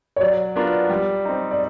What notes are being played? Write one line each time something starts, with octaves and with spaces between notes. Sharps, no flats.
C#5
F#3 D5
B3 D4 F4 A#4
G3
C4 D#4
D5